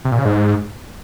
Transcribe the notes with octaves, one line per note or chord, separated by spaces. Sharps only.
C3
A#2
C#3
G#2